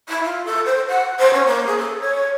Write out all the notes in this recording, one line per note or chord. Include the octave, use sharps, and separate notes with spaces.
E4
F4
A4
C5
F#5
C5
C#4
A#3
G#4
A4
C#5